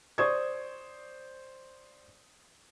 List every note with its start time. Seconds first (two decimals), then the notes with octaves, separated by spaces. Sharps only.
0.18 C5 D5 C#6 D#6 G#6